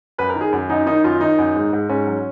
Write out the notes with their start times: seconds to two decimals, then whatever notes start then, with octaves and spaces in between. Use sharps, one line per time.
0.18 F#2 B4
0.30 A#4
0.35 D#3
0.41 G#4
0.52 F#2
0.70 F#2 D#4
0.86 D#3 D#4
1.04 F#2 F4
1.21 D#3 D#4
1.38 F#2
1.55 G#2
1.73 G#2
1.89 G#2 C#4
2.07 F#3